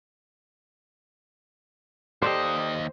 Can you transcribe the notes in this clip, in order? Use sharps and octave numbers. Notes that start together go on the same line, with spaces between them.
D#2 G4 A4 C5 D5 D#5